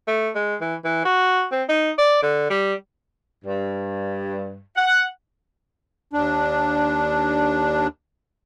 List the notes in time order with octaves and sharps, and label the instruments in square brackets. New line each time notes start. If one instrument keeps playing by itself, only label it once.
[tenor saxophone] A3
G#3
E3
E3
F#4
C4
D#4
D5
D3
G3
[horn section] G2
F#5
[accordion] D#2 D4